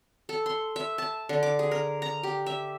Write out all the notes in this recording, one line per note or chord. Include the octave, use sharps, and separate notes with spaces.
A4
C6
E5
A5
D3
D6
G#4
A#4
A#5
G4
E5